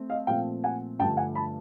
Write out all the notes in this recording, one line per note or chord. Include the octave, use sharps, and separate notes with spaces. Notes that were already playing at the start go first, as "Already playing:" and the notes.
Already playing: A3 C4
D#5 F5
A#2 F3 A3 C4 F5 G5
F#5 G#5
G2 D3 F3 A3 G5 A5
F#5 G#5
A5 B5